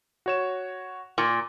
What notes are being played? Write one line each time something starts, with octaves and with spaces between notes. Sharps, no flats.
F#4 C#5 E7
A#2